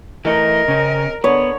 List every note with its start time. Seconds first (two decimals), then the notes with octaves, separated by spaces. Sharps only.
0.25 E3 A3 D#4 A#4 D#5
0.68 C#3 C4 C#4
1.24 D3 B3 C#5